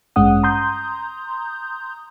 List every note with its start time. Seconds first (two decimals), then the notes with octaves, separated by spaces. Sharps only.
0.16 A1 G2 G#3 C#4 F#5 D#6
0.43 A#5 C6 D#6 G6